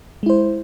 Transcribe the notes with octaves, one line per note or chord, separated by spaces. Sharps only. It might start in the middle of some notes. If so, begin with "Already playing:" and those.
G#3 E4 C5